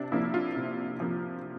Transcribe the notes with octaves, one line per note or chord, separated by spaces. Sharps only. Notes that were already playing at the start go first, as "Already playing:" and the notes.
Already playing: C3 D4
F3 A#3 E4
F4
C3
F3 A#3